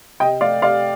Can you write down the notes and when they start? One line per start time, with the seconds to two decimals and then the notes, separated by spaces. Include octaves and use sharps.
0.20 C3 D#5 G5
0.41 A3 D5 F5
0.62 C3 D5 F5